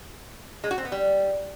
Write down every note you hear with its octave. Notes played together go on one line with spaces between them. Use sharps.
G#3
F#4
C4
B3
G3